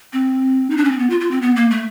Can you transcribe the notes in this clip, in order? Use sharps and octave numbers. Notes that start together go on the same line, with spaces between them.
C4
D#4
D4
C#4
C4
B3
F4
F4
C4
B3
A#3
A3